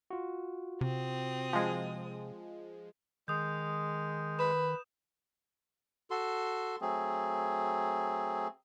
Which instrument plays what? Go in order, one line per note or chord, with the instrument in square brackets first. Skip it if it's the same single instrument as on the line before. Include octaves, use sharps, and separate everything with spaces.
[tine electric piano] F4 F#4
[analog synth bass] C3 [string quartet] C4 D#6
[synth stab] F3 G#3
[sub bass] D#3 [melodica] G#3 [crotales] D#6 G6
[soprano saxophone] B4 [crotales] E7
[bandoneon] F#4 A4 C6
F#3 A3 C4 G#4